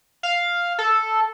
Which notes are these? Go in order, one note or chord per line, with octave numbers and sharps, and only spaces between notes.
F5
A4